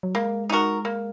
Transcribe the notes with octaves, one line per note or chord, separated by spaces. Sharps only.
F#3
G#3 A#3
D#4 F#4 A#4
A#3